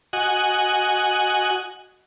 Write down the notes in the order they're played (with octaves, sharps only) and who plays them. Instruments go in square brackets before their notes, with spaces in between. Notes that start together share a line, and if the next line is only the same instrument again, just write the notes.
[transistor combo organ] F#4 D#5 F#5 G#5